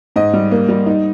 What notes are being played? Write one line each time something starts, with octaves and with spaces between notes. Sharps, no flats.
G#2 D#5
G3
A#3
G3
D#4